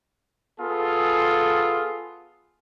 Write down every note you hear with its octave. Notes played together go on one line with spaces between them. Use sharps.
B3 F4 G#4 A4